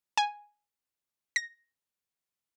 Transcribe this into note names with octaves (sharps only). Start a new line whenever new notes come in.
G#5
A#6